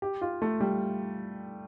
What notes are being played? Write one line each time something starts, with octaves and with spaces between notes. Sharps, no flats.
G4
F4
A3
G3